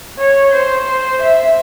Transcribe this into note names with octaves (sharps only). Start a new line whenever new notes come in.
C#5
C5
E5